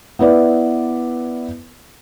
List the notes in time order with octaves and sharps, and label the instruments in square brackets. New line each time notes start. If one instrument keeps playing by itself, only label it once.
[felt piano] B3 E4 B4 D5